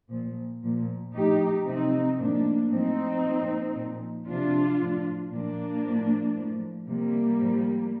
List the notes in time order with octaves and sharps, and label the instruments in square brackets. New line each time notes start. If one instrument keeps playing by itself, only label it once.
[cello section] A#2 F3
A#2 F3
A2 F3 D#4 G4
C3 F3 C4 D#4
A2 F3 A#3 D4
A2 F3 C4 D#4
A#2 F3
A#2 F3
C3 F3 D4 F4
A2 F3
A#2 F3 A#3 D4
A2 F3
A2 F3
C3 F3 G3 A#3
A2 F3